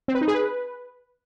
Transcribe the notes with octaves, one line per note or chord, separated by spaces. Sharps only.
C4
B4
D#4
G#4
B4